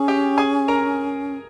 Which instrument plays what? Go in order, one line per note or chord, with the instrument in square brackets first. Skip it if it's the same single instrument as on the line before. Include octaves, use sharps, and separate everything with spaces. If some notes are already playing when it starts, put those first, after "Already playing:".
Already playing: [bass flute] C#4 [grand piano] G#4
[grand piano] G4 G5
G#4 G#5
A#4 A#5